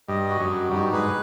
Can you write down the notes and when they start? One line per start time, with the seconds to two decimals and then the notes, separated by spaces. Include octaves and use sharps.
0.08 G2 D#5
0.29 F#4
0.40 F#2
0.51 F#4
0.72 G2 D#4
0.93 G#2 B4